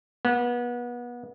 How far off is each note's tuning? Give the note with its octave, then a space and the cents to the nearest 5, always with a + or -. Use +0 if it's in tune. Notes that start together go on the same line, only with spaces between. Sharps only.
B3 -30